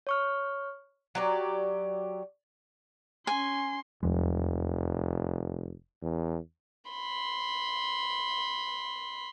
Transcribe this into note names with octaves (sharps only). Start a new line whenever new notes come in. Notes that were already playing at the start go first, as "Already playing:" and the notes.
C#5 C#6 F6
F#3 G4 D5
C#4 G#5 C6
F1 E2 F3 G#3
E2
B5 C6